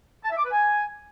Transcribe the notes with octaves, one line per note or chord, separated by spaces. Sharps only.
A5
E5
D6
B4
G#5